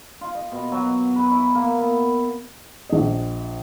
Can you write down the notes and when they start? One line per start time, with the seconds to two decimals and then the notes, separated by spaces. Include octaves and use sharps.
0.21 F4
0.35 D#5
0.52 B2
0.72 F#3
1.16 B4
1.31 E4
1.55 A#3
1.78 B3
2.89 A#1 D#5